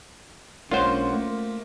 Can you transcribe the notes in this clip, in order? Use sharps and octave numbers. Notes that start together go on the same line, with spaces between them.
B1 G#3 A#3 C#4 D4 F4 C5 F#5
A3 A#3